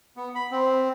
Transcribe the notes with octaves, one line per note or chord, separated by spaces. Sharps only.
B3
B5
C4